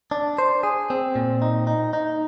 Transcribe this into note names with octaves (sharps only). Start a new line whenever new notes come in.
D4
C5
G#4
C4
A#2
D#4
D#4
D#4